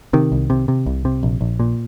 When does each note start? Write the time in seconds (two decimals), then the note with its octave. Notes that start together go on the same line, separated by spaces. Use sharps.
0.13 C3 D#3
0.32 C2
0.50 C3
0.68 C3
0.86 C2
1.05 C3
1.23 A#1
1.41 A#1
1.60 A#2